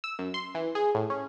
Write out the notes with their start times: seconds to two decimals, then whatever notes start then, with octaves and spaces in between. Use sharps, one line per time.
0.04 E6
0.19 F#2
0.34 C6
0.55 E3
0.75 G#4
0.94 A2
1.10 C#4